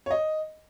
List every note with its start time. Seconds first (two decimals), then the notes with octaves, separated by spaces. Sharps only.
0.06 C#5
0.11 D#5